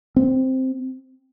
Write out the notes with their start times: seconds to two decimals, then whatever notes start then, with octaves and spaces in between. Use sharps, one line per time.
0.16 C4